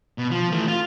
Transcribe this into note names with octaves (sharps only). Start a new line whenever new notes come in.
B2
F3
E3 A3
F4